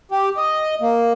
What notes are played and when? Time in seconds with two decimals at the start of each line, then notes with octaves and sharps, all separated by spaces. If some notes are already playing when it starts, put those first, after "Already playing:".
0.11 G4
0.37 D#5
0.82 A#3